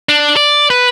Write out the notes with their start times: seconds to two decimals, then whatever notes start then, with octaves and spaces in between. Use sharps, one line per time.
0.09 D4
0.37 D5
0.70 B4